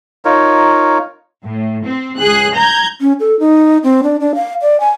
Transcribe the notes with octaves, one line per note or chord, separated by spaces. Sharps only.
D#4 F4 A#4 C#5
A2
C4
C#2 G#4 F#6
A#5 G6 G#6
C#4
A4
D#4
C4
D4
D4
F5
D5
G#5